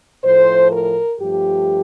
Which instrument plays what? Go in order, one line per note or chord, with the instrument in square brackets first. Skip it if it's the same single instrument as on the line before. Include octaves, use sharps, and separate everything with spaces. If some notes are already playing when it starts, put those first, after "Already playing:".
[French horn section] A2 F3 A3 C5
A#4
G2 F3 A3 G4